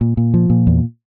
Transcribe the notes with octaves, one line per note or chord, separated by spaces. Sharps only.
A#2
A#2
F3
A#2
E2